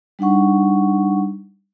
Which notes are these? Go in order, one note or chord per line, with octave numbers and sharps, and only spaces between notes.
G3 D4 D#4 F#5 C#6